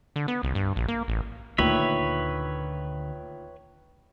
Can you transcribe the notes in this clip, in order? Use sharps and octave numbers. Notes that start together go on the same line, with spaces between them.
D3
B3
C2
G2
A#1
A#3
A1
D2 A#2 D#3 B4 C#5 E5